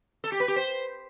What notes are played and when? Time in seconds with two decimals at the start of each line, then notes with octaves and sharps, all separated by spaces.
0.24 A4
0.32 G4
0.40 B4
0.48 G4
0.56 C5